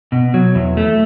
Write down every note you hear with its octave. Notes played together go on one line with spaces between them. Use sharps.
B2
F#3
E2
A3